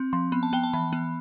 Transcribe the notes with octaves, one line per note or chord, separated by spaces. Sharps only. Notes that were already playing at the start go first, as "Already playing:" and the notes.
Already playing: C4
F3 C6
B3 B5
A5
B3 G5
A5
E3 B5
B3